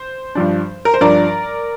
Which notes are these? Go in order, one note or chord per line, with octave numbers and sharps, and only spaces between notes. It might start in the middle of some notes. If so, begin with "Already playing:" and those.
Already playing: C5
G2 F3 D4
A#4
C5
G2 F3 D4 A#4 D5